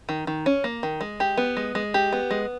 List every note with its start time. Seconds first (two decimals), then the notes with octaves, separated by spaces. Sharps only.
0.09 D#3
0.27 D#3
0.46 C#4
0.64 A#3
0.83 D#3
1.01 G#3
1.20 G4
1.37 B3
1.57 G#3
1.75 G#3
1.94 G4
2.12 B3
2.31 G#3